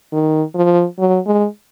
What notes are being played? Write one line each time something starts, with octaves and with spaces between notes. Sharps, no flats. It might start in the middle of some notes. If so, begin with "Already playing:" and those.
D#3
F3
F#3
G#3